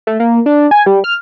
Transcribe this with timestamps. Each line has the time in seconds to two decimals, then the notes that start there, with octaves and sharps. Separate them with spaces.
0.07 A3
0.20 A#3
0.46 D4
0.71 G#5
0.86 G3
1.04 F6